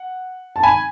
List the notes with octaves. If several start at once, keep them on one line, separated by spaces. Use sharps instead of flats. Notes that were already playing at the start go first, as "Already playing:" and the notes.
Already playing: F#5
A5
G#5 B5